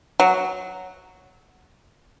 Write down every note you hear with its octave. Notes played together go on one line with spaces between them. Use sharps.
F#3